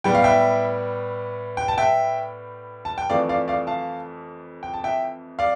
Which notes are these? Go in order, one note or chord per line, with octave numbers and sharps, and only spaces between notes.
A2 G3 B3 G5
F5
E5 G5
G5
A5
E5 G5
A5
G5
F2 E3 A3 D5 F5
D5 F5
D5 F5
F5 A5
G5
A5
E5 G5
D5 F5